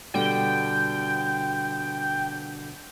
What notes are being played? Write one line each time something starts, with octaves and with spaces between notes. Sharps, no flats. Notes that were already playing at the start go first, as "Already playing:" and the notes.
B2 D3 G3 G5